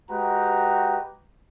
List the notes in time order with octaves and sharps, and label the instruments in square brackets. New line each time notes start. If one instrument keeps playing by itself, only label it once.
[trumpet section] G#3 F#4 G4 B4 G5 A#5